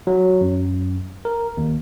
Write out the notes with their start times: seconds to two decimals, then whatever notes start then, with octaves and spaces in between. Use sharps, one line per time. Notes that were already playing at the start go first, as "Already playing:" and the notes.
0.07 F#3
0.41 F#2
1.25 A#4
1.57 D#2